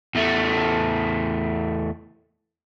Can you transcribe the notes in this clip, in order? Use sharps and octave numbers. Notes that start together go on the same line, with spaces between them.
E2 A3